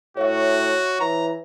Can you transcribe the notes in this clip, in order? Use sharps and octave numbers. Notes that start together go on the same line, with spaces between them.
A2 F#4 C#5 E5
E3 A#5